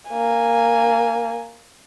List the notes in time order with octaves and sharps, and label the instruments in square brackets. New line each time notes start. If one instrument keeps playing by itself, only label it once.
[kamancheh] A#3 G#5